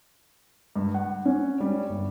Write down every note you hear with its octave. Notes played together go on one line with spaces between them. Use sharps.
G2
F#5
C#4
G3
G1